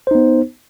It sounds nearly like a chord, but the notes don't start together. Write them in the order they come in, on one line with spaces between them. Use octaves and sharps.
C5 D#4 B3